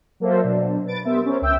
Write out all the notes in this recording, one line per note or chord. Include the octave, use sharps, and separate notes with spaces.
F#3 A#3 A4 C5 E5
B2 F#3 D4
B4 A6 D7
G3 B3 A#4 C5 E5
C#4 A#4 C5
C#2 E5 G5 E6